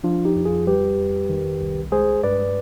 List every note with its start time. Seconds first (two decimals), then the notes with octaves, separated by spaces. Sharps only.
0.04 F3 D4 F4
0.25 D#4 G4
0.36 F2
0.45 F4 G#4
0.67 G3 G4 B4
0.98 F2
1.29 D#3
1.61 C2
1.92 G#3 G#4 C5
2.23 G2 B4 D5